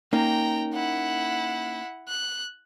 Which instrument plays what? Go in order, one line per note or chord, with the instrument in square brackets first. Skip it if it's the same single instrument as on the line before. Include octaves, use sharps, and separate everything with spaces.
[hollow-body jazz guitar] A#3 C#4 D#4 [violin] G5 A#5
[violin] E4 F#5
F#6